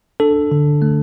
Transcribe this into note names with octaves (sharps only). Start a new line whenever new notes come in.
D4 A4
D3
A3